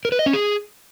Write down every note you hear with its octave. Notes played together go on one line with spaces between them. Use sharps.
A#4
B4
D#5
C#4
G#4